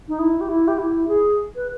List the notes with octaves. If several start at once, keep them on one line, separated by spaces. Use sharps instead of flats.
D#4
E4
G4
E4
G4
E4
G#4
B4